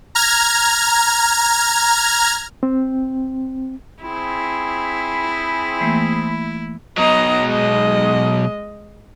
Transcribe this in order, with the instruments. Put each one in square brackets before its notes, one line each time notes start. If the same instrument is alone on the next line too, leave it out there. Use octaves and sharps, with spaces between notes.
[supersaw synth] A#5 F6 G#6
[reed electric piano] C4
[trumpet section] C4 G#4 [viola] E4 [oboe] B5
[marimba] E3 A3 A#3
[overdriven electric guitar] B2 F#3 [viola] D#5 A#5
[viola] G#3 D#5